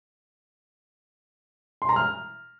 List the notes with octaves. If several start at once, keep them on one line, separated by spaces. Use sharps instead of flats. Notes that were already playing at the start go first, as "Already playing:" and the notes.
C6
A#5
F6